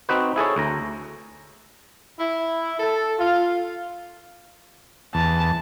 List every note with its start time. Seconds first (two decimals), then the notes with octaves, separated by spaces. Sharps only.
0.09 C4 D#4 F#4 B4
0.36 E4 G#4 A4 C#5
0.56 D2 A#5
2.18 E4
2.78 A4
3.19 F4
5.15 E2 A5